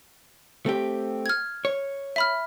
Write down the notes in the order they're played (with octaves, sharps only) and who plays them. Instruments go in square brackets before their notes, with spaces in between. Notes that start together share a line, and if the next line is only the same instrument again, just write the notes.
[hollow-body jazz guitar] A3 C4 G4
[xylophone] F6 G#6
[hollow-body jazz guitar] C#5
[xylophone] E5 B5 F6